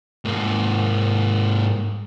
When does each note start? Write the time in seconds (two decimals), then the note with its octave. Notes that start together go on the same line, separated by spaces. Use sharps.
0.25 G#2 A#3